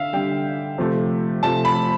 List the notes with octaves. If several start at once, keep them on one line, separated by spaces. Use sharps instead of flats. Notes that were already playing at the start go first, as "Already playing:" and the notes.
Already playing: D3 E5 F5
D3 G3 G5
C3 F3 A3
C3 F3 A3 A5
B5